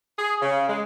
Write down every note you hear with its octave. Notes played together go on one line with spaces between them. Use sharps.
G#4
C#3
G#3